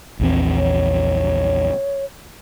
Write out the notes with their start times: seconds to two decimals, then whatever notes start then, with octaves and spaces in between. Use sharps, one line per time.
0.20 A#1 E2 C4
0.58 C#5